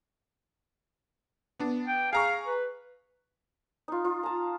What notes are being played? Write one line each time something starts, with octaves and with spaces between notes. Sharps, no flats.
B3 D4
G5
G#4 F5 A#5 C#6
B4
D#4 F4
F4
A5 A#5